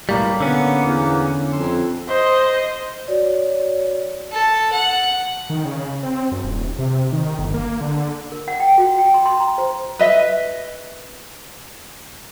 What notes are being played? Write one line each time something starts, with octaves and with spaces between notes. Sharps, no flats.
B1 A2 G3 A#3
D3 B3 C#4
E2
F2 C6 E6
C5 D#5
F#4 C#5 D5
A4
F#5
D#3
C#3
C4
F#2
D#1
C3
D#3
G1
A#3
D3
A#4
F#5
G5
F#4
G5
C6
C6
A#5
C5
B4 D#5 E5